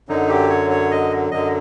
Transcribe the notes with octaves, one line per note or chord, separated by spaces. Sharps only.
F#2 D3 F#3 D#4
G4
C#5
C#5
D#5
F#2 D3 F#3 D#5